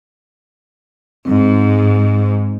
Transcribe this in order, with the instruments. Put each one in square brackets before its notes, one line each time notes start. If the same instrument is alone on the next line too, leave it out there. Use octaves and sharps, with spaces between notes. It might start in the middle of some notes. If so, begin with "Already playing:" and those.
[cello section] G#2 [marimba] C4